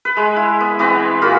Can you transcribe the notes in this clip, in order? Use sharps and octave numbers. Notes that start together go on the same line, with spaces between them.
B4
G#3
E4
B3
E3 B3 C4 B4
A#2 F#4 F5 B5